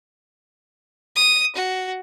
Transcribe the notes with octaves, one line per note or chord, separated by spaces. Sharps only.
D#6
F#4